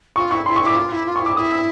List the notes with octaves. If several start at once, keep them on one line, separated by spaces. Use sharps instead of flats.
F4 C#6
E4 C#6
E4 C6
C#6
E4
D6
F4
E4
F4
C#6
E4 D6
E4 D#6
E6